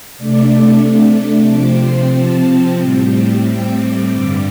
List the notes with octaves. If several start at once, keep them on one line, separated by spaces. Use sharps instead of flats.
C3 A3 D4 D5
C3 F3 C4 D6
C6
A5
A2 G3 C4
G5
D6
G2 D3 G3 D6